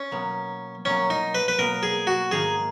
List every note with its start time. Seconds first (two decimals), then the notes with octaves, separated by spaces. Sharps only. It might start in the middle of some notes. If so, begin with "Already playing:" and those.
Already playing: C#4
0.11 B2 F#3 A#3
0.85 B2 F#3 A#3 C#4
1.10 D#4
1.35 B4
1.48 B4
1.59 B2 F#3 A#3 A#4
1.83 G#4
2.07 F#4
2.31 G#2 D#3 A#3 D#4 G#4